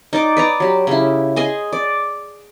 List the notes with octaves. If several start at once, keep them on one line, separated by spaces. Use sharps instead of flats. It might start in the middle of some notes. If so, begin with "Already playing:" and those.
D#4 D5 D6
B4 D5 A#5
F#3 G4
C#3 E4
G#4 D#5 G#5 C6
D5